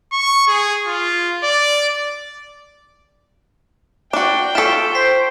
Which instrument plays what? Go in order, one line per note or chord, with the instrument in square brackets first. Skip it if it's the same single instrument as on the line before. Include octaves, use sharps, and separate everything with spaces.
[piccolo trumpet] C#6
G#4
F4
D5
[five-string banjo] D4 F#4 [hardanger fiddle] G5 [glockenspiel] D7
[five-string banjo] F4 A4 [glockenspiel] C#6 B6 E7
[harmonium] C5 [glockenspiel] B6 C7